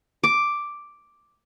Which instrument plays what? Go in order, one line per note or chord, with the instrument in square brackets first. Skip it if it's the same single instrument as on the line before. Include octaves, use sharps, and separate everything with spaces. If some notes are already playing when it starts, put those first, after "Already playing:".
[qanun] D6